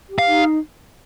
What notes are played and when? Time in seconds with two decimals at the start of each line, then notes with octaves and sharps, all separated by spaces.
0.09 G4
0.19 F5
0.27 D#4